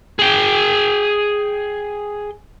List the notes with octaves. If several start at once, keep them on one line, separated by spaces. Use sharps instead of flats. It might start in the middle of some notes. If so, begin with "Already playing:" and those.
G#4 G5